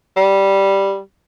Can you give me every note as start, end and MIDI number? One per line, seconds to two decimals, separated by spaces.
0.16 0.99 55